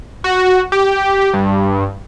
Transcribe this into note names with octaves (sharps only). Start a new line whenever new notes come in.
F#4
G4
G2